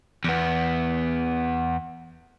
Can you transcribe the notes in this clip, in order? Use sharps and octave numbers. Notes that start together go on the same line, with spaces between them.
E2 B3